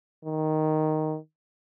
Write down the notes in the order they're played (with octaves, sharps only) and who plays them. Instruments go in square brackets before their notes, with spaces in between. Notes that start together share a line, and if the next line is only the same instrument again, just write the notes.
[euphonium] D#3